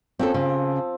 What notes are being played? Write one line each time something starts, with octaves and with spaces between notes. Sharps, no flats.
F3 C4 C#4 A4
C#3 C4